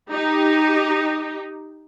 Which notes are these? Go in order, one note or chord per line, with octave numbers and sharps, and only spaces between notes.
D#4 G4